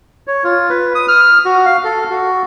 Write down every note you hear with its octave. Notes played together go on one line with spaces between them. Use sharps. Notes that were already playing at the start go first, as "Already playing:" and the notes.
C#5
F4
B4
D#6
F6
F#4
F5
A4
F#4